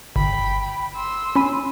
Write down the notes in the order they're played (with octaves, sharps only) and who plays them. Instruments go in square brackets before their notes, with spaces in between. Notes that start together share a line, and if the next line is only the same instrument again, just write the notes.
[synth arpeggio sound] G1 [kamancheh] G5 B5
[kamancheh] C6 E6
[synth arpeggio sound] C#4 B5 D#7